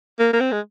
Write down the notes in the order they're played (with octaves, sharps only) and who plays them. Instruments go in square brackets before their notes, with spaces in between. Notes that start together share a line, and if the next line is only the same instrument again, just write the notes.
[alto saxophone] A#3
A#3
C4
G#3